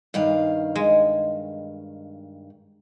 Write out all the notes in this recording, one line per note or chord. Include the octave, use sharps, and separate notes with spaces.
G2 D#3 F5
G#3